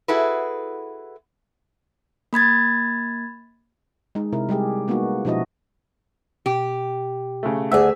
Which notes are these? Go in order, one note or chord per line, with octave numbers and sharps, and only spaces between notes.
E4 F#4 G#4 A4 B4
A#3 B5 G#6 A6
G#3 D#4
C3 E4 A#4
G3 G#3 G4 G#4
G#3 A#3 B3 D#4 F#4
B2 F3 D4 E4 F#4 D#5
B2 G4
C#3 A3
D2 G#4 D5 E5 F#5 E6